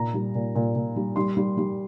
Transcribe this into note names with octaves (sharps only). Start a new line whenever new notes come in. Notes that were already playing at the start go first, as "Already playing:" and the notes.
Already playing: A#2 A#5
G3
A#2
A#2
A#2
G3
G3 C6
G3
G3